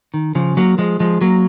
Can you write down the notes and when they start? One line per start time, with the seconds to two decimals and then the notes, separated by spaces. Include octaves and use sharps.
0.14 D#3
0.35 C#3 F3
0.57 F#3 A#3
0.78 F3 G#3
1.00 F3 G#3
1.21 F#3 A#3